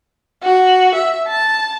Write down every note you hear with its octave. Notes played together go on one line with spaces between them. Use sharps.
F#4
E5
A5